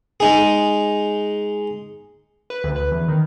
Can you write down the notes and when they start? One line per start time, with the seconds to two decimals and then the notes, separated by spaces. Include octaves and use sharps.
0.20 G#3 D#4 G#4
2.50 B4
2.64 D2
2.76 B4
2.92 E2
3.08 D#3